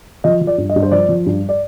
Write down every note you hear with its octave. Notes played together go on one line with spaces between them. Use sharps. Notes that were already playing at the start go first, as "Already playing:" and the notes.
F3 D#5
F3
D5
G2
D#5
G2
C5
F3 D5
F3
G2
D5